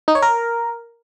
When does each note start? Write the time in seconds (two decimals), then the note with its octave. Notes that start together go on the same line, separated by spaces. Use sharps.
0.08 D#4
0.15 C#5
0.22 A#4